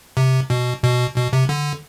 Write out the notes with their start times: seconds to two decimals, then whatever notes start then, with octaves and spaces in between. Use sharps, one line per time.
0.17 C3
0.50 B2
0.83 B2
1.16 B2
1.33 C3
1.49 D3